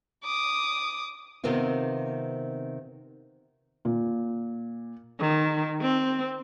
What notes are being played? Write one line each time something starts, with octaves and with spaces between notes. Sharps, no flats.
D6 D#6
C3 D#3 B3 C4 F4
A#2
D#3
C4